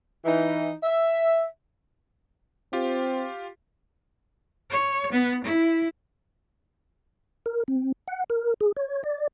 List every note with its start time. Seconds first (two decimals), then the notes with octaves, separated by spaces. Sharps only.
0.25 E3 D#4
0.83 E5
2.73 C4 F4 G4
4.70 C#5
5.12 B3
5.44 E4
7.46 A#4
7.68 C4
8.08 F#5
8.30 A#4
8.61 G#4
8.77 C#5
9.04 D5